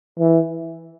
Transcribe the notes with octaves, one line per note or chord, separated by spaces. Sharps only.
E3